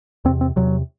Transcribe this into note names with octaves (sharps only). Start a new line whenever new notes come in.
E2 C3 C4
C4
E2 C3 F#3